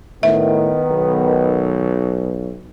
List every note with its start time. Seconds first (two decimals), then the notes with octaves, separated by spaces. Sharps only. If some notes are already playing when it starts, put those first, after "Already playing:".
0.23 A2 D#3 B3 E5
0.90 B1